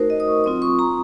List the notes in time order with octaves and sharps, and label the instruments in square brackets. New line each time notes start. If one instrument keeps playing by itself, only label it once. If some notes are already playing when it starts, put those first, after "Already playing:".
Already playing: [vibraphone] A3 D#4 F#4 A#4 C5
D#5
D#6
C#6
F#3 C4 F4 D#6
C#6
A#5